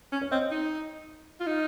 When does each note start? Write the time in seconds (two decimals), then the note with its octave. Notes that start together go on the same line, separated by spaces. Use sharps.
0.12 C#4
0.21 C#5
0.31 C4 D#5
0.51 D#4
1.40 F4
1.47 D#4